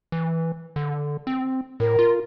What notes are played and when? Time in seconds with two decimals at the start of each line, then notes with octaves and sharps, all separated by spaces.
0.12 E3
0.76 D3
1.27 C4
1.80 A2 A#4
1.99 F4